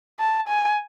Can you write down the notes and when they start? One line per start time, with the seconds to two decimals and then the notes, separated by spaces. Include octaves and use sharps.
0.19 A5
0.48 G#5